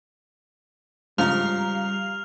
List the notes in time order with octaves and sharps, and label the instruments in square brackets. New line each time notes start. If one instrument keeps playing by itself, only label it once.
[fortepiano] G#2 C#3 F3 [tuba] G3 [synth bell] F5 A#5 [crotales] F6 F7